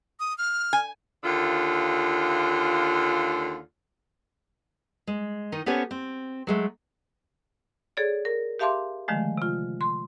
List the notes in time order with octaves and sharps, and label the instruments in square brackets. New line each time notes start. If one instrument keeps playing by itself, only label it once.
[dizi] D#6
F6
[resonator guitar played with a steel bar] G#5
[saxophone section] D#2 D3 F4
[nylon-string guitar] G#3
D#3 D#4
B3 C#4 G4 A4 C5 C#5
C4
F#3 G#3 A3
[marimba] G#4 A4 C#5 D5
A#4
G4 E5 F5 A5 C6 D6
D3 D#3 F3 G#3 A3
C3 F4
C6